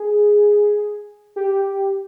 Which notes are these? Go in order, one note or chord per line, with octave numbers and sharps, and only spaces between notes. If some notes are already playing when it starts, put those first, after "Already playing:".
Already playing: G#4
G4